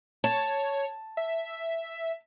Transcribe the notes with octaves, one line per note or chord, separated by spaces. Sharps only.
C#5 A5
E5